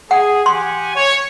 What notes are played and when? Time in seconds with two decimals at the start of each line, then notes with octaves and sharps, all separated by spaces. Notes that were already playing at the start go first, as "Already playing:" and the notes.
0.11 G#4 F#5
0.46 G4 F#5 G#5 C6
0.96 C#5